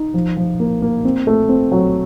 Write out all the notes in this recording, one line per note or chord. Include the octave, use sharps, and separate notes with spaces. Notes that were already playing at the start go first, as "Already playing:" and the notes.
Already playing: D#4
F3
F3
A#3
A#3
C4
A3
C4
F#3